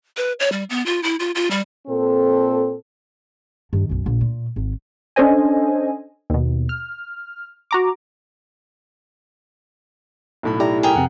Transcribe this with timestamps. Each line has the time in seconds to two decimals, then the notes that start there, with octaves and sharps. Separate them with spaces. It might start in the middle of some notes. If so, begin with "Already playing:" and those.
0.17 B4
0.40 C#5
0.52 G3
0.70 B3
0.86 F4
1.03 E4
1.20 F4
1.35 F4
1.51 G3
1.87 A#2 C4 A4
3.73 G2 D#3
3.89 B1 F#2
4.06 A#1
4.21 A#2
4.56 G#1
5.16 C#4 D4 A4 C5 D#5 G#5
6.30 D#2 B2
6.69 F6
7.71 F#4 A#5 D6
10.43 B1 A2 B5
10.60 E4 G4 D5 A#5
10.83 G#4 A#4 G5
10.96 F2 C3 F#5